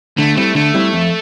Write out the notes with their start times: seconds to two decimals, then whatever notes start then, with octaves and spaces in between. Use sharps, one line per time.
0.17 D3 A3
0.36 G3 A3 C4 E4
0.55 D3 A3
0.74 G3 C4 E4
0.93 F2